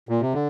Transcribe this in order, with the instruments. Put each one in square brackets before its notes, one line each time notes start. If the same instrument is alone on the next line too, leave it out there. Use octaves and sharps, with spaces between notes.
[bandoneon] A#2
C3
D3